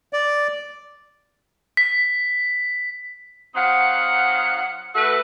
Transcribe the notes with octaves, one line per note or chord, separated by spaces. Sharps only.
D5
B6
F#3 C4 D#4 F5 F#5
A3 F#4 A4 B4